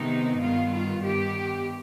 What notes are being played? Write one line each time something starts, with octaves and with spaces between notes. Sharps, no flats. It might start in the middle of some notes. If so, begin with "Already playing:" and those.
Already playing: C3 D#3 G#3 B3 D#4
G2 D#3 G3 B3 F4
F4
G2 D#3 B3 G4